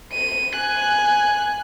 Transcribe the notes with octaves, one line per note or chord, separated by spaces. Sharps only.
D#7
G#5 F#6